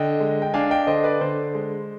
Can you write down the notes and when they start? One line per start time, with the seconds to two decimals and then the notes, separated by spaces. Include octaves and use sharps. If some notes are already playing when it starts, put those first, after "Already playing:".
Already playing: D3 D#5 G5
0.20 G#3
0.42 G5
0.54 D4 F5 G#5
0.70 D#5 G5
0.87 D3 C5 D#5
1.04 B4 D5
1.21 D3 C5
1.55 G#3